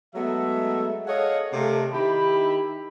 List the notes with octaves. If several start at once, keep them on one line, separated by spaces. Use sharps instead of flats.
F#3 G#3 A3 B3 E5
G#4 A4 C#5 D#5 F5 F#5
C3 A3 A#3
D#3 D#4 E4 G4 B5